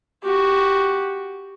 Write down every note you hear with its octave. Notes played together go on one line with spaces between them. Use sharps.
F#4 G4